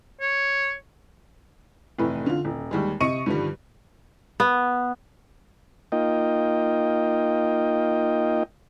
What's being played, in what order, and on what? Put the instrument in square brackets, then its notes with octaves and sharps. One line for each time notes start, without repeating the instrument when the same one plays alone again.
[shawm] C#5
[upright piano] F1 A2 E3 B4
D3 F4
D#1
D#2 G3 G#3
C3 D#5 C#6 C#7 D#7
G2 D3 D#3 F3 G3
[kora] B3
[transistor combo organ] A#3 D#4 F4 D#5 G5